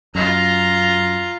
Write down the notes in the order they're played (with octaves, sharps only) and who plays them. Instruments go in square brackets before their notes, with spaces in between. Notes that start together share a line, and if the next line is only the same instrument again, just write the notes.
[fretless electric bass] F#2 [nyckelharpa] F4 A#5